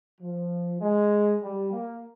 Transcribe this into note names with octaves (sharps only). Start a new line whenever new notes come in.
F3
G#3
G3
A#3